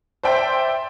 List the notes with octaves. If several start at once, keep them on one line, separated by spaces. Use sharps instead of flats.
C5 D5 E5 G5 C6